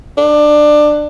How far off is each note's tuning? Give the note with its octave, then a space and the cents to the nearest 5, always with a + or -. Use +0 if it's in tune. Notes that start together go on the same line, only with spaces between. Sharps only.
D4 +20